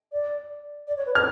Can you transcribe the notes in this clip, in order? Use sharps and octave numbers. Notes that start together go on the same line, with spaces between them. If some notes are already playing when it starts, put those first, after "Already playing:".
D5
D5
C#5
B4
A4 F6